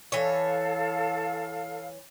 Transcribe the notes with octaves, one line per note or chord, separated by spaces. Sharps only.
E3 A4 C#5 F5